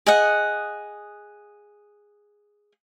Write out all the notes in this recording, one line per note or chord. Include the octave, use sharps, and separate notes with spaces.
G#4 D#5 F#5